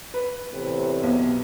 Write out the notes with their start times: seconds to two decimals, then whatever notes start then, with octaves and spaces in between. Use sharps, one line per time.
0.14 B4
0.52 E2 A2 C3
1.02 B1 B3